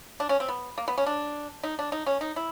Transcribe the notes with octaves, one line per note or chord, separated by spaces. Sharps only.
D4
C#4
C4
B3
A#3
B3
C#4
D4
D#4
D4
D#4
C#4
D#4
E4